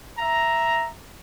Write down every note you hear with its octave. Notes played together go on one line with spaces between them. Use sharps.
E5 A#5